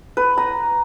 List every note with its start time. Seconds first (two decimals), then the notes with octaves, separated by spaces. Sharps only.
0.17 B4
0.37 A#5